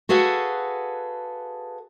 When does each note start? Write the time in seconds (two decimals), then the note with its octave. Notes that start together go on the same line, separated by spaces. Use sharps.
0.09 F#4 G#4 A4 B4 F5 F#5